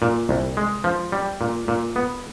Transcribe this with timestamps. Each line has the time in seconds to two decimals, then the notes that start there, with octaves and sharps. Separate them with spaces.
0.02 A#2
0.29 C2
0.57 G#3
0.84 F3
1.12 G3
1.41 A#2
1.68 A#2
1.96 B3